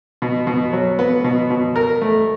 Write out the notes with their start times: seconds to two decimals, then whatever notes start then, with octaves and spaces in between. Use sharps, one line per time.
0.22 B2
0.47 B2
0.73 F#3
0.99 B3
1.24 B2
1.50 B2
1.76 A#4
2.01 A3